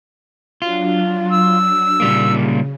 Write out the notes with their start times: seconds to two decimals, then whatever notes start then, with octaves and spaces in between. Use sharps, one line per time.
0.62 F#3 D4 F4
1.31 E6
2.00 A#2 C#3 G3 A#3